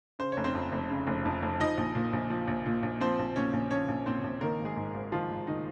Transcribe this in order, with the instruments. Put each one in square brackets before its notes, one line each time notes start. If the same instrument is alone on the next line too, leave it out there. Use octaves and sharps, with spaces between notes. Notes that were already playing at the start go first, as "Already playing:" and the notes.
[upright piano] C#3 C5
F1 C#5
C4 C5
F2
F1
C#3
F1
F2
F1
F3 D#4 D#5
A#1
A#2
A#1
F3
A#1
A#2
A#1
F3 C4 C5
A#1
A#2 C#4 C#5
A#1
F3 C#4 C#5
A#1
A#2 C4 C5
A#1
D#3 A#3 A#4
G#1
G#3 G#4
G#2
G#1
D#3 F3 F4
G#1
D#3 D#4